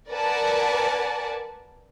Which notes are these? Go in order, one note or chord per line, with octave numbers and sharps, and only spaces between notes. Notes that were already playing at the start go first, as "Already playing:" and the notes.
A#4 B4 D5 F#5 G#5 A5